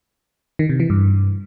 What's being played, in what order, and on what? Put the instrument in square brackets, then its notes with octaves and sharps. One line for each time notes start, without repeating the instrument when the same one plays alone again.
[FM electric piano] D#3
C3
E3
G2